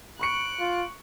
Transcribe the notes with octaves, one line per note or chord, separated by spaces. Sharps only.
B5 C#6 F#6 C#7 D7
F4